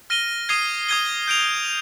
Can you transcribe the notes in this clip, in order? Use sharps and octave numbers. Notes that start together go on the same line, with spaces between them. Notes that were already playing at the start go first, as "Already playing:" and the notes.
F6 A#6 D#7 G7
D#6 G#6 C7 D#7 G7
D#6 G#6 C7 D#7 G7
G6 D7 F7
F7